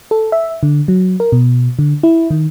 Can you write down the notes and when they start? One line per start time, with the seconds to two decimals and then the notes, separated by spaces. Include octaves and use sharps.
0.11 A4
0.32 E5
0.63 D3
0.88 F#3
1.20 A#4
1.32 B2
1.79 D3
2.03 E4
2.31 D#3